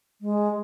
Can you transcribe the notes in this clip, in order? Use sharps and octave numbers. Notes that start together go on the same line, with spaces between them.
G#3